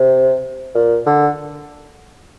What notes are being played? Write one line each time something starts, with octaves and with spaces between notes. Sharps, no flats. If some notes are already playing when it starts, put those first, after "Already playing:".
Already playing: C3
A#2
D3